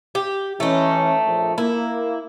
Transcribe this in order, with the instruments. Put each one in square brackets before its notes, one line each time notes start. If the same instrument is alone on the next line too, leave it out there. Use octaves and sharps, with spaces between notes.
[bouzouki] G4
[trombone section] E3 C#4 [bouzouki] A3 D#4
[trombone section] A#1
[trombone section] A#3 [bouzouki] E4